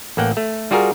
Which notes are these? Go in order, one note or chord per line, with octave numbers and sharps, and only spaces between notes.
A1 A#3 F#5 G5
A3
G3 F4 F#4 G#4 A#4